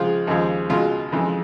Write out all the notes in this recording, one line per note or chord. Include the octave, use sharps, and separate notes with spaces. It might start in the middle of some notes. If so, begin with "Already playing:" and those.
Already playing: C#2 C#3 F3 G#3 F4
D#2 C#3 F3 G#3
C#2 B2 G#3 F4
F2 C#3 E3 G#3